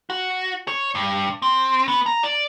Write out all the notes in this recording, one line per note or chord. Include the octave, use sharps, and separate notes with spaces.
F#4
C#5
G2
C4
B3
A#5
D5